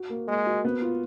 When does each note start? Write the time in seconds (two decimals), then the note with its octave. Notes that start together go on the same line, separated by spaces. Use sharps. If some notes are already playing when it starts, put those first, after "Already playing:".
Already playing: F#4
0.09 A#3
0.28 G#3 A#3
0.46 F#4
0.65 B3
0.82 F4